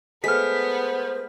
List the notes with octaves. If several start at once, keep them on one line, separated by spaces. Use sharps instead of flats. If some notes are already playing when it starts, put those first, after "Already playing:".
G#3 A3 B3 C5 F6 B6